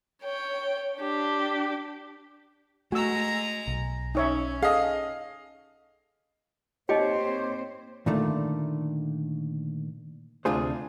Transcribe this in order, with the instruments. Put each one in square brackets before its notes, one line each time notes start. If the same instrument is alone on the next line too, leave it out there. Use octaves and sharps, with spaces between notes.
[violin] C#5 G5
D4 G4
[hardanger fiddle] G#3 A#5 [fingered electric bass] A3 [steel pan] F#4 E6
[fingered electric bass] B1
[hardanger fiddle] C#4 [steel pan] D#4 C#5 E5
[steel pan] G#4 A4 [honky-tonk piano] D#5 F5
[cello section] A#3 C4 C5 [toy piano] D#4 D#5 G5 [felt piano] G4 [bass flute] C#5
[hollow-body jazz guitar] A#2 D3 D#3 A3
D2 C3 D4 F4 G#4 C5